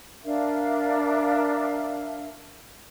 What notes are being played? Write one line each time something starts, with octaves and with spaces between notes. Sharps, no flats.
D4 A#4 E5 F5